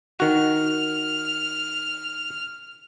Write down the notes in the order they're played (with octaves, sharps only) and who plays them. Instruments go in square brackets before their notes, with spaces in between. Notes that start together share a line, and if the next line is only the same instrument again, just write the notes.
[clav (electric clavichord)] D#3 F#4 [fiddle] F6